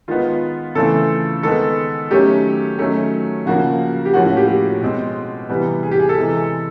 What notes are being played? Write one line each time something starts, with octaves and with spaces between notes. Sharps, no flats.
D#3 G#3 B3 F4
C#3 E3 A3 C4 A4
D#3 G#3 B3 A4
D#3 F#3 A3 C#4 G4
D#3 F#3 A3 C#4
C#3 F3 A#3 F#4
G4
A2 F3 A#3 C#4 F#4
F#4
G4
G4
B2 G#3 C4
C3 E3 G3 B3
G#4
G4
G#4
A4
C3 E3 G#3